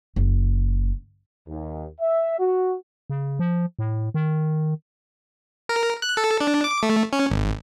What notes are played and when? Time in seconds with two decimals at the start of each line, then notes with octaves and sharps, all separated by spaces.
0.16 F#1
1.48 D#2
2.01 E5
2.40 F#4
3.10 C#3
3.39 F3
3.79 A2
4.14 D#3
5.69 A#4
6.02 F#6
6.17 A4
6.40 D4
6.64 D6
6.83 A3
7.13 C#4
7.30 G#1